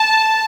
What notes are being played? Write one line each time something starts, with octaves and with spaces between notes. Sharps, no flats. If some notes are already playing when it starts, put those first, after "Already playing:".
Already playing: A5